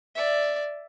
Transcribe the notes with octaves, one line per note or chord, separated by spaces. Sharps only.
D5 E5